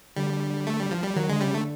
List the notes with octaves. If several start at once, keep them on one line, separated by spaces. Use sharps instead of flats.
D3 G3
A3
G3
F3
G3
D#3 F#3
D3 G#3
C#3 G3
D3 A3